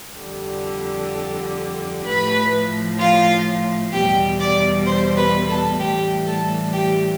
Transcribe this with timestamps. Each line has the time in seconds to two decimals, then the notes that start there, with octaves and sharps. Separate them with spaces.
0.20 F2 D3 G3
2.06 A2 F3 B4 B5
3.00 F4 F5
3.93 E2 B2 G3 G4 G5
4.40 D5 D6
4.87 C5 C6
5.18 B4 B5
5.49 A4 A5
5.80 A2 E3 G3 G4 G5
6.27 A4 A5
6.73 G4 G5